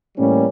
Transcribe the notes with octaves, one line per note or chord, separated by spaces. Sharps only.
A2 E3 G3 A#3 C#4